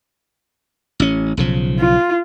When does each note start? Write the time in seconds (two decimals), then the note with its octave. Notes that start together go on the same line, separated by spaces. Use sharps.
1.00 A1 C#4
1.37 B1 C#3 F3
1.80 F4